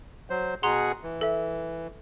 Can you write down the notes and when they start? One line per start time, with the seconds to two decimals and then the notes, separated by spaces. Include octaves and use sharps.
0.30 F#3 C5
0.63 B2 G#4 F#5 A#5 C6
1.03 E3
1.21 A4 E5